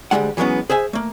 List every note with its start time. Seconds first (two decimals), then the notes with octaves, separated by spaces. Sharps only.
0.11 D2 B2 G3 G#3 F#5
0.37 E3 F#3 G#3 A#3 B3 C#4
0.70 G#4 C5 E5 G#5
0.93 A3 A#3